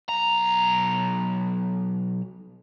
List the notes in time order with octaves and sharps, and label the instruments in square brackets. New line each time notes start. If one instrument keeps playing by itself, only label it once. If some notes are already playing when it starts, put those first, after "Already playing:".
[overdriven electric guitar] B1 A#5